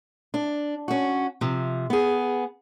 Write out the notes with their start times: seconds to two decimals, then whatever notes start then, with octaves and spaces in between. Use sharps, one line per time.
0.34 D4
0.88 C#4 F#4
1.41 C3 F3
1.90 B3 G#4